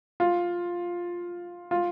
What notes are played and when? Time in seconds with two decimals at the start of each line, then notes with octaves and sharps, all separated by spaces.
0.20 F4
1.71 F4